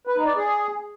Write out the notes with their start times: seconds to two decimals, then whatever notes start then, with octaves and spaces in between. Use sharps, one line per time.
0.07 B4
0.17 D#4
0.26 D5
0.36 G#4